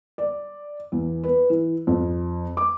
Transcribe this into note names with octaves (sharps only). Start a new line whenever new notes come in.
D5
E2
B4
E3
F2
D6